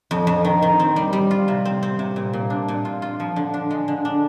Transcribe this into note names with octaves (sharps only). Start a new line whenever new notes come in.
F2
F2
D#3
D#3
C4
G3
G3
F4
C3
C4
C4
C3
A#2
A#2
D4
A#2
F4
F4
F3
D3
D4
G#3
D3
D4